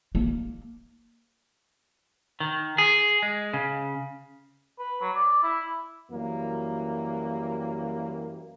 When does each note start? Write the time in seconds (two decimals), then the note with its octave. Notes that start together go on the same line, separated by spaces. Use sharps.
0.15 A#3
2.40 D#3
2.78 G#4
3.23 G#3
3.54 C#3
4.79 B4
5.01 F#3
5.15 D5
5.43 E4
6.11 F#2 E3 G3 A#3